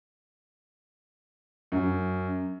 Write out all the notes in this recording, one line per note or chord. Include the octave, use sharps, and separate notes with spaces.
F#2